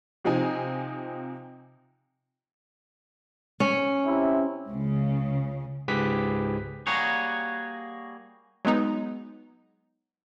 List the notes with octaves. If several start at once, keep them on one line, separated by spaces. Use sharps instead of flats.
C3 F3 C4 D#4 G#5
C#4
C3 E4
C#2 C#3
C#2 G#2 G4 G#4 B4 B6
G3 A#3 F#4 G#4 C#5
F#3 G#3 B3 D#4